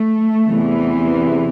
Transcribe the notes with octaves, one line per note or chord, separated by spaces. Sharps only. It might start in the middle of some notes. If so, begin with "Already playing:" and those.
Already playing: A3
E2 C3 E3